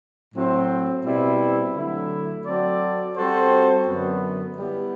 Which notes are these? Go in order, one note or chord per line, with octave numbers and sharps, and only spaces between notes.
A2 F#3 C4
B2 G3 C4 E4
D3 F#3 A3 E4
F#3 C4 F#4 A4 D5
G3 C4 F#4 A4 C5
F#2 D3 F#3 B3
G3 B3 E4 G4